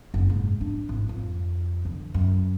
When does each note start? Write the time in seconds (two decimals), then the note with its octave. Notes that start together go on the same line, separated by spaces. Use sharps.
0.14 F#1
0.29 G#2
0.61 D4
0.89 G#1
1.09 F2
1.85 D3
2.14 F#2